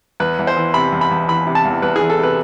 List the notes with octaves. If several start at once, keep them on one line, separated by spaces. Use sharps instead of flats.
E2 B4
E2
C5
E3
C3 B5
E2
B5
E2
E3 B5
C3
A5
E2
E2 B4
E3 G#4
A4
C3 B4